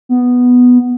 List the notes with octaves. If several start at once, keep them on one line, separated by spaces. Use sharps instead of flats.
B3